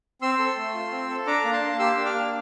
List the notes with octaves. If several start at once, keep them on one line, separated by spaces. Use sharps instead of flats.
C4 C6 E6
A4
A3
F4
C4
A4
D4 A#5 D6
A#3
A5 C6
A#3
G4 C6 E6
D4
D6 F6
A#3